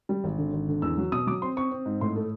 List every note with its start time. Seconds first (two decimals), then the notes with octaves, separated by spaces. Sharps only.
0.09 G3
0.24 G#1
0.38 D3
0.53 G#1
0.68 D3
0.82 E2 E6
0.97 F#3
1.12 B2 D#6
1.27 F#3 D6
1.42 C4 C6
1.57 C4 C#6
1.71 C4
1.86 G#2
2.01 A2 C6
2.16 A3